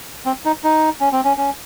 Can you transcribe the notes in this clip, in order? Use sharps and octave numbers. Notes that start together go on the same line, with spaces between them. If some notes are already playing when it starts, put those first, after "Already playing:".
C4
D#4
D#4
C#4
C4
C#4
C#4